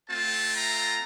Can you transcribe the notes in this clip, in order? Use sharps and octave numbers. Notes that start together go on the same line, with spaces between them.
A3 C4 F4 A5
A#5